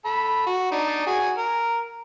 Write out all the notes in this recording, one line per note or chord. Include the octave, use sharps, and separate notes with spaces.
A4 B5
F#4
D4 D#4
F#4 G#4 G#5
A#4